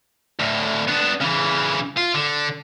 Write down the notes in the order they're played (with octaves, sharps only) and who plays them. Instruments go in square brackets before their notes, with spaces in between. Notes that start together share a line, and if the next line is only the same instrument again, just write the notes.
[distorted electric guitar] D2 A2
B3 D4
C#3 E3
F4
D3